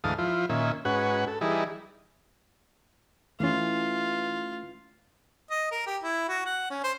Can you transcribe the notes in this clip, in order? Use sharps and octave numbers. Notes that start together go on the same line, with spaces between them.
D2 G#2 E3 F5 A5 D#6
F3 E4 F4
A#2 D#3 C#4 E5
G#2 C#4 F#4 B4 F#5
A4
E3 G3 D#4 E4 G#4
E3 A3 C#4 F4
D#5
A#4
G4
E4
F#4
F#5
C#4
C5